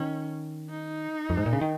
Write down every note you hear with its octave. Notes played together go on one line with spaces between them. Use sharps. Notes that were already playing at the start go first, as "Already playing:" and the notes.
Already playing: D#3 C#4
D#4
F2
G#2
A#2
C#3
D#3